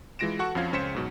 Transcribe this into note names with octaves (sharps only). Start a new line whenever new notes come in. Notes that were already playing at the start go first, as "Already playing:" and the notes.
E3 G#3 F4 A#6 D7 E7
F#4 A4 F#5 C#6
F2 F3 C#4 F5 G#6
C#2 C#4 C5 B6 C#7 E7
G#2 B2 F#3